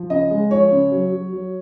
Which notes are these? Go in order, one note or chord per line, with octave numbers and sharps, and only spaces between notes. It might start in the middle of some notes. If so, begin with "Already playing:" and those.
Already playing: F3
C#3 D#5
G#3
F3 C#5
C#3
F#3
F#3
F#3